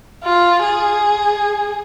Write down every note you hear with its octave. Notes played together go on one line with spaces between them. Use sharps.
F4
G#4